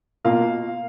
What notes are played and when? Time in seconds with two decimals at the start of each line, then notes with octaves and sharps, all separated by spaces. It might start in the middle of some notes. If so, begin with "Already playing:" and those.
0.24 B2 A#3 F4 F5